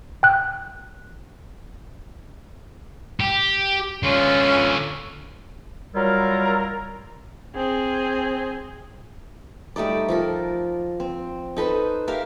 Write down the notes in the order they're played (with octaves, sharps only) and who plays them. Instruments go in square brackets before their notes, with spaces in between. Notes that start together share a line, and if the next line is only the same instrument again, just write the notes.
[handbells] G5 F#6
[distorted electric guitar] G4
[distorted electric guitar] D3 F4 [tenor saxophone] C#4
[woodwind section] F#3 G3 E4 F4 A#4
[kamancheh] C4 G#4
[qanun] G3 A3 D#4 D5
F3 A4 A#4
C4
D#4 A4 B4 C5
G4 A#4 E5 F5